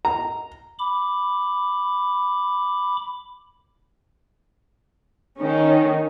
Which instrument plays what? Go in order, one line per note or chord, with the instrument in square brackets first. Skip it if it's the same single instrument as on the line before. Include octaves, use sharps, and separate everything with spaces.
[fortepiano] A#5
[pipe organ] B5 D6
[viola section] D#3 C#4